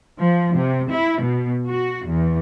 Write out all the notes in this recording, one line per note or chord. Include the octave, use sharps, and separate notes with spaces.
F3
C3
E4
B2
F#4
E2